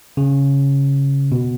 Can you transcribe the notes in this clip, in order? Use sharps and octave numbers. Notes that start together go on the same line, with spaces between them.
C#3
B2